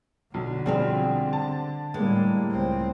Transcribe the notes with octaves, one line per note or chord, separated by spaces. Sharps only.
B1 D3
B1 F3 G3 C4 G#4 F5
A5
A2 G3 G#3 A#3
C#2 C4